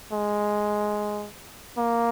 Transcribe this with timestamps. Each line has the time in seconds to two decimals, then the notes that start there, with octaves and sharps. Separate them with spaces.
0.12 G#3
1.77 A#3